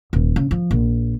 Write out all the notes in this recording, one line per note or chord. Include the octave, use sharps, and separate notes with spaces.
D#1
C#3
F3
A#1